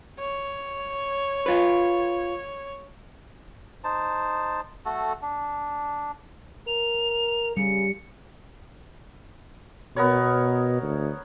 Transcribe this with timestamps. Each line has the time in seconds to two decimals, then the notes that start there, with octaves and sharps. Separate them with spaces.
0.19 C#5
1.46 F4 B4
3.84 D#4 C5 A5
4.85 A3 F#4 A4
5.22 D4
6.67 A#4 F7
7.57 C#3 G3 C#7
9.96 B2 B3 A#4 C#5
10.82 D2